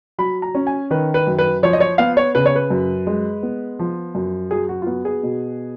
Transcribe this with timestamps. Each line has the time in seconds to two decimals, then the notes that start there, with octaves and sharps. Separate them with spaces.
0.18 F#3 B5
0.42 A#5
0.55 C#4
0.67 G#5
0.91 D#3 B4
1.14 B4
1.27 F#2
1.39 B4
1.63 F3 C#5
1.73 D#5
1.80 C#5
1.98 B3 F5
2.17 C#5
2.35 C#3 B4
2.45 C#5
2.56 B4
2.70 F#2
3.07 G#3
3.43 B3
3.79 F3
4.15 F#2
4.51 F#3 G#4
4.69 F#4
4.82 F4
4.86 B3 F#4
5.05 G#4
5.23 B2